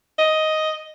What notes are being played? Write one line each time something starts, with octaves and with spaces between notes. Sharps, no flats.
D#5